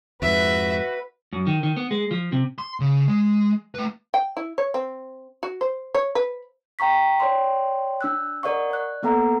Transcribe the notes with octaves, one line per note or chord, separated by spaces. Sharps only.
F2 G#2 F#4 B4 E5
F#2
D#3
D#3
B3
G#3
F3
C3
C6
C#3
G#3
A3 B4
G5
E4
C#5
C4
F#4
C5
C#5
B4
G5 A#5 C#6 B6
C#5 D5 G5 C6
D4 E6 F#6
A#4 D5 D#5 F#5 C#6
D5 F#6
A#3 B3 A4 F#5 A#5